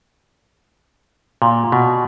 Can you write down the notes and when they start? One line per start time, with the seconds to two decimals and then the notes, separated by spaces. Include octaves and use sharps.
1.42 A#2
1.72 B2